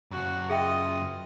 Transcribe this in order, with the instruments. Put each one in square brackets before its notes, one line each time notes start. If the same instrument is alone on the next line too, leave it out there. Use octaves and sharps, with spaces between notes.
[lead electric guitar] F#2 C#3 [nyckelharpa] F#4
[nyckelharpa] F4 D#5 [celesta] G#4 E5 G5